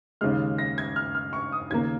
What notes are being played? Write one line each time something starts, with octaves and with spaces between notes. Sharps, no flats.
D#2 C#3 G#3 F6
A#6
G#6
F6
F6
C#6
D#6
D#2 C#3 A#3 G#6